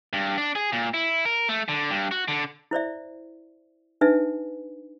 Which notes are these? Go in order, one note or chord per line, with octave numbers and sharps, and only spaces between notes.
G2
D4
G#4
A#2
E4
A#4
A3
D3
G2
F#4
D3
E4 C5 D5 E5
D4 D#4 B4 E5 G#5